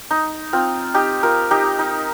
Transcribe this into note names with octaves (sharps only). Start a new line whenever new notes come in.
D#4
C4 F4
D#4 G4
F4 A#4
D#4 G4
D#4